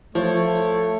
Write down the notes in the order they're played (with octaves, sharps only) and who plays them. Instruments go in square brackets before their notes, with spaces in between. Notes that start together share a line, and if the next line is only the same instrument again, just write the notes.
[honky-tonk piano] F3 [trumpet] A3 [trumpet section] C#5